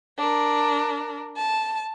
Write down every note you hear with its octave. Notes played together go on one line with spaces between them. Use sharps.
D4 A#4
A5